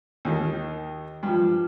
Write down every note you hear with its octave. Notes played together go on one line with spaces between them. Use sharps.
D#2 D#3
G2 F3